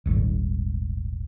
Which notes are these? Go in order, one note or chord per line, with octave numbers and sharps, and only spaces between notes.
D#1 G#1 G#2